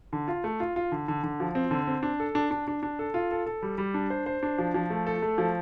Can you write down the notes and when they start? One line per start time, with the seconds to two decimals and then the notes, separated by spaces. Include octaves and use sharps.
0.13 D3
0.28 F4
0.44 A3
0.60 F4
0.76 F4
0.92 D3
1.08 D3
1.23 D3
1.40 F3
1.55 C4
1.71 D3
1.87 C4
2.03 D4
2.20 A4
2.35 D4
2.51 D4
2.68 D4
2.83 D4
2.99 A4
3.14 F4
3.31 A4
3.46 A4
3.62 G3
3.78 G3
3.94 D4
4.10 C5
4.26 C5
4.43 D4
4.58 F3
4.74 F3
4.90 A3
5.06 A4
5.22 A3
5.38 F3